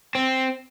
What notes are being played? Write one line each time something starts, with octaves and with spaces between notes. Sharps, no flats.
C4